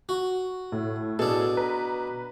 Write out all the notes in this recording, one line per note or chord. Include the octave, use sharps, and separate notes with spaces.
F#4
A2
B2 D4 G#4 A4
B4 A#5